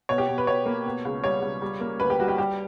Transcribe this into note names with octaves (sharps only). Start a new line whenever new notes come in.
B2 C#5
G4
B2
B4
B2 C#5
A#3
B2
C#2
G3 C#5
C#2
G3
A#3
D2 B4
G4
G3 F#4
G4
G3 G4